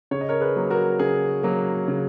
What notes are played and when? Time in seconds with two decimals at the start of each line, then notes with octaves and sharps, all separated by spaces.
0.11 C#3 C#5
0.21 D#5
0.29 A#4 C#5
0.41 G#4 B4
0.56 F#3 A#3
0.70 F#4 A#4
0.99 C#3 G#4
1.43 F#3 A#3
1.88 C#3